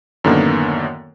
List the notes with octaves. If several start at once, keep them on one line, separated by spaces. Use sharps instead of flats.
F#2 A2 D3 D#3 A#3 B3